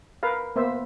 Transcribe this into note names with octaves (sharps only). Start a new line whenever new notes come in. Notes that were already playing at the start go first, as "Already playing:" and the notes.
A#4 B4 F5
A#3 B3 C5 E5